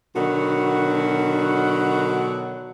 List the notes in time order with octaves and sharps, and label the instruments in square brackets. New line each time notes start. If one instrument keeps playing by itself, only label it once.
[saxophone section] B2 D3 D#3 F#3 D4 F#4